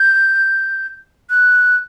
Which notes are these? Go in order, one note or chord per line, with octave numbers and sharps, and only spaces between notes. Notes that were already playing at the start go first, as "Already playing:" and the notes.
Already playing: G6
F#6